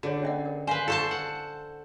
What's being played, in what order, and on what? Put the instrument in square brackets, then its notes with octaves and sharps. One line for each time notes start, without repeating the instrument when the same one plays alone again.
[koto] D3 [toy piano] F#4 G#4 C#5
[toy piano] C#4 D#5 F#5
A#4
[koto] B4 C5 [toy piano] F5 G#5
[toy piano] E4 C#6 [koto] A4 C5 A5
[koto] F#5